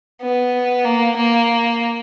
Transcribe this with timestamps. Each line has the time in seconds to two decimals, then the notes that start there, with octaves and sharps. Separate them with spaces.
0.22 B3
0.85 A#3
1.17 A#3